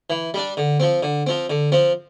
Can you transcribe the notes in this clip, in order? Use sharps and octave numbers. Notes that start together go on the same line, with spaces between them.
E3
G3 D4
D3
F3 C4
D3
F3 C4
D3
F3 C4